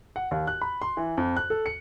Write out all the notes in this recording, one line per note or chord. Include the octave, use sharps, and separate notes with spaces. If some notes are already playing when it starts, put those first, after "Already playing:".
F#5
D#2
F#6
B5
C6
E3
F2
F#6
A4
C#7